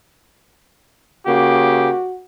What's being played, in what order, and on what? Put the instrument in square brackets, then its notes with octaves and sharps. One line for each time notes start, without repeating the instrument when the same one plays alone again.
[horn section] C#3 A#3 G4 [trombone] F#4